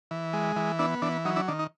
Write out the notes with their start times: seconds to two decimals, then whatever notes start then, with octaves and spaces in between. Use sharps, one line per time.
0.11 E3
0.33 G#3
0.56 E3
0.79 B3 D4 E4
1.02 E3 D4
1.25 F#3 D#4
1.36 D4 E4
1.48 D#3 D4
1.59 D#4